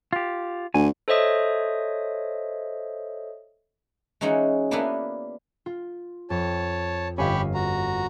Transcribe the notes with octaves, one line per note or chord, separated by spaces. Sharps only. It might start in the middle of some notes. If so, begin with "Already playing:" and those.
F4 G4
D2 G#5
A4 C5 C#5 D#5 E5 D#6
E3 G#3 C#4 D#4 F#4 G#4
A#3 B3 D4 E4 A#4 B4
F4
F2 C#5 A5
G1 C#4 G4 D#5 F5 G#5 B5 C#6
F#4 A#5